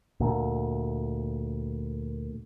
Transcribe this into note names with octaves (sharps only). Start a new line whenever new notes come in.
D2 A#2